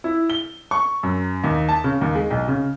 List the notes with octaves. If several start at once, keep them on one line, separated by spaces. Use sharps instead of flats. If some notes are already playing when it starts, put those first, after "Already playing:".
E4
G7
C#6
F#2
D#2
A5
C#3
D#2
G#3
B1
C#3